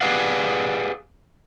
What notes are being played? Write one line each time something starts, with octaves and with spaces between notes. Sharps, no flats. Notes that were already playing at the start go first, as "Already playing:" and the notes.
G4 G#4 B4 D5 F5 F#5